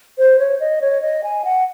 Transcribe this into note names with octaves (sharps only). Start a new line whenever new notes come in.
C5
C#5
D#5
C#5
D#5
G#5
F#5